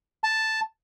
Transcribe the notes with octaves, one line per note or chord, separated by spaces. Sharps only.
A5